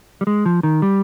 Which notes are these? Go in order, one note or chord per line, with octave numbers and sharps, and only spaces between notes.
G3
G#3
F3
D#3
G3